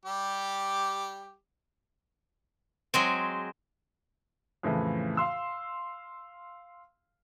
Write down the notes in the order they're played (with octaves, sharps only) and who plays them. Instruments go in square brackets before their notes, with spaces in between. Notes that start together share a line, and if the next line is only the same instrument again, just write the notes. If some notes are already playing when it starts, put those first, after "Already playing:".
[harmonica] G3 G4 D6
[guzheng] F#3 G#3 C4
[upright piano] F2 A2 C#3 E3
F5 C6 E6